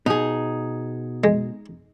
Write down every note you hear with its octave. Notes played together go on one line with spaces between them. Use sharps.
B2 D#4 G#4
G#3